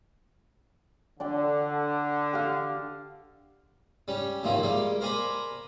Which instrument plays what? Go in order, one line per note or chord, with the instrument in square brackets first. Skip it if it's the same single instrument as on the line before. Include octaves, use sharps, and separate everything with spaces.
[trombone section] D3 [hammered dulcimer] D4 D5 G5
[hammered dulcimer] G4 F5
[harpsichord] G3 C#4
D#2 A2 F3 A#3 D#4
G3 G#3 A#3
A#4 C5 D5 G#5 A#5 B5